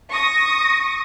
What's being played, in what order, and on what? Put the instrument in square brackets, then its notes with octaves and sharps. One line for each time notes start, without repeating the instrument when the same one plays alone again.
[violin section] C#6 D#6 A#6